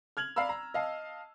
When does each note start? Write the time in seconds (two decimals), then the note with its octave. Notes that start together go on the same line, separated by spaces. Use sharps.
0.17 F6 G#6 F7 F#7
0.36 D5 F5 A#5 B5 E6
0.49 A#5
0.74 D#5 F5 A5